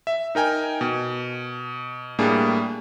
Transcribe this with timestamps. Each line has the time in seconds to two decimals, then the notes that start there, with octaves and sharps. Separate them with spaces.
0.07 E5
0.35 D#4 A#4 G5 G#5
0.81 B2
2.19 A2 G3 A#3 D4 G#4